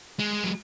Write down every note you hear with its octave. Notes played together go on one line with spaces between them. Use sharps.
G#3
F#3